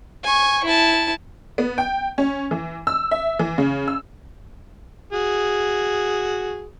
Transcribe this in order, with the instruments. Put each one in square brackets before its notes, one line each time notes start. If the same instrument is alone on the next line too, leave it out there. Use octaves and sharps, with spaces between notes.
[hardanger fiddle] G#5 C#6
E4 A5
[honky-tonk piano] B3
G5
C#4
E3
E6
E5
E3
C#3
E6
[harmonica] F#4 G#4